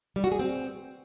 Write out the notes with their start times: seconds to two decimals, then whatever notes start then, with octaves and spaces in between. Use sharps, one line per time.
0.16 G3
0.24 F#4
0.32 G#4
0.39 C4